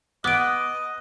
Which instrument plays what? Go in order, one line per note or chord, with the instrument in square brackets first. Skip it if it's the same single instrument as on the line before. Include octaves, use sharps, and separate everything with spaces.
[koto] B3 [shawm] D#5 [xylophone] D6 D7 [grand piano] F#6